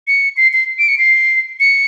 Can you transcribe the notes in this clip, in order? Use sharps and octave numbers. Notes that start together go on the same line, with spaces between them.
C#7
C7
C7
D7
C#7
C7
C#7